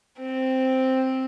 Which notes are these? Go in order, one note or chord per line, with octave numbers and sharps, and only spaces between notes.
C4